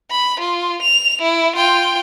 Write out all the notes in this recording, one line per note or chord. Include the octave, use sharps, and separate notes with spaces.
B5
F4
F7
E4
F4 G5